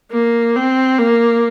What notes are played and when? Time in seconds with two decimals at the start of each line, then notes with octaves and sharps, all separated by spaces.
0.12 A#3
0.56 C4
0.98 A#3